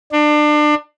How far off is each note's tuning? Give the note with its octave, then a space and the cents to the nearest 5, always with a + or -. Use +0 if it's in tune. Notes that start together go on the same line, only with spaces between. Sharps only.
D4 +30